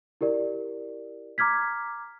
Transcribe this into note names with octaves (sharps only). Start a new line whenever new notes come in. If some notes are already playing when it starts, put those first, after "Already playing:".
E4 G4 A#4 D5
A#5 D6 F6 G#6 B6